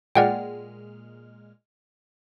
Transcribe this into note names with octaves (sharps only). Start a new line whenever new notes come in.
A#2 G#3 D5 F#5 G5 F6